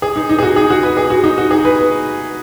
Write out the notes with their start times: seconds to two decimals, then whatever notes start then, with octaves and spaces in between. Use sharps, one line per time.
0.02 G#4
0.16 D#4
0.29 D#4
0.39 G#4
0.43 F#4
0.56 G#4
0.70 F#4
0.83 B4
0.97 G#4
1.10 F#4
1.24 D#4
1.38 F#4
1.51 G#4
1.65 B4